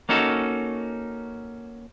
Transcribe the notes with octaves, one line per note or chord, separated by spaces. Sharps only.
A#3 C#4 D#4 F#4 A4